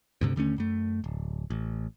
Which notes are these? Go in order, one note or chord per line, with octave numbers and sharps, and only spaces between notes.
D2 G2 C3
D#2 D3 A3 C#4
F#2 A3
D1
A1